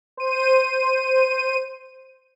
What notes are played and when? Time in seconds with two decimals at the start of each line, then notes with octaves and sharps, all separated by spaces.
0.17 C5 D#7